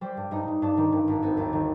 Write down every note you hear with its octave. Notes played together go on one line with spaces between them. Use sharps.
G3 C5
G2
G2 D#4
G2
G2 D4
D#3
G2
G#1
B3 C4
D#2
D#3